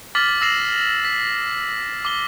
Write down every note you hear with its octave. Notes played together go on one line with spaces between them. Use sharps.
D6 F6 A6 B6 F#7
E6 A#6 C7 E7 F#7
B6
D6 G7